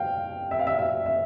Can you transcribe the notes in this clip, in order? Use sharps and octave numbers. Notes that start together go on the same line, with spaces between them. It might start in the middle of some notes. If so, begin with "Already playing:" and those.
Already playing: F5 G5
E5
F5
E5
E5
E5